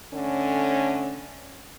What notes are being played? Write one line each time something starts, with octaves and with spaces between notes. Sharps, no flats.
D3 A3 C#4